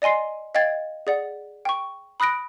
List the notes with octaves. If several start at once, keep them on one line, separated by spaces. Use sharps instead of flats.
D5 D#5 G#5 C6 C7
D#5 F5 G5 G#6 A6
G#4 D5 F#5
G5 C#6
B5 D#6 F#6 A#6 D7